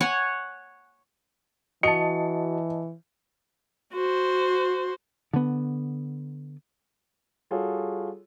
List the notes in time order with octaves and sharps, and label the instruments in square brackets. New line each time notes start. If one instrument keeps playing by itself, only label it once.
[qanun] C#5 F#5 G#5
[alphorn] E3 [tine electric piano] F#4 [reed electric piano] D#5 A5 [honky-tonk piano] C#7
[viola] F#4 C5
[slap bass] D3 B3
[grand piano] G3 F4 F#4 G#4 A4 C#5